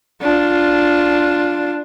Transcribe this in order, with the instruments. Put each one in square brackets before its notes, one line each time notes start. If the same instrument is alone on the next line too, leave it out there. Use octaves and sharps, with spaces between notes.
[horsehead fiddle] D4 F4